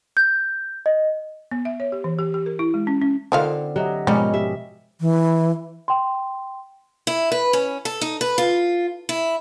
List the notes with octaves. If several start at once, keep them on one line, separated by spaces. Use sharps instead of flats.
G6
D#5
B3
E5
C#5
G4
E3
G4
G4
A#4
E4
G#3
C#4
C#4
D3 D#3 C4 F4 F5
F#3 G4 D#5 E5
G#2 B2 F3 G3 C#4 D#4 A#4
G4 D#5 E5
E3
G5 C6
E4
B4
C#4
A4
D#4
B4
F4
E4